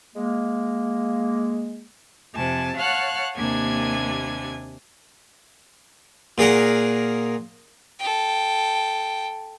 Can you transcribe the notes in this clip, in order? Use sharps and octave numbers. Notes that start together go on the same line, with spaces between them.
G#3 A#3
F2 C3 G#5 A5
C#5 F5 F#5 A5 F6 F#6
D#2 C3 A#3 D4 G#5 G#6
A#2 G#4 A#4 F#5
A4 G5